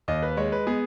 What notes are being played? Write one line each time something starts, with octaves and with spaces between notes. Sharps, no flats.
D#2 D#5
B4
G#3 C#5
B4
B3 G#4